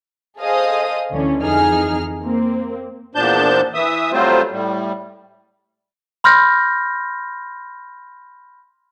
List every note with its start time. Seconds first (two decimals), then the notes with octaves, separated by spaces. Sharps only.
0.39 G#4 A4 C5 D#5 F5 D#6
1.13 D2 D3 E3 C#4
1.42 F2 E3 D#4 G#4 F6
2.24 A#3 C4
3.15 E2 A#2 F3 D4 A5 G6
3.74 E3 E5 D#6
4.12 F#3 G3 A3 C4 F4 C5
4.52 A2 G3
6.24 B5 C6 F6 G6 A#6